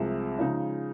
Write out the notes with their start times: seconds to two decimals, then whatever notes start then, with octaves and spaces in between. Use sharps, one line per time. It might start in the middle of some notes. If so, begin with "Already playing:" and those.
Already playing: C2 C3 F3 G#3
0.39 C#3 F3 G#3 D#4